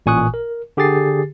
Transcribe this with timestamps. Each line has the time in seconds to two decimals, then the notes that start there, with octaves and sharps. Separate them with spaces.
0.06 A1 A#2 G#5 C#6 D#6 F#6
0.34 A#4
0.77 D3 G4 G#4 A6 C7